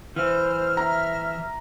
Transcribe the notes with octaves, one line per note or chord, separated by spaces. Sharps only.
E3 C5 F6
E5 A#5